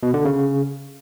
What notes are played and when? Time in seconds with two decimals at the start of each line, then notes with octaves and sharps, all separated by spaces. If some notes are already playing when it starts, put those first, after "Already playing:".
0.03 B2
0.14 D3
0.25 C#3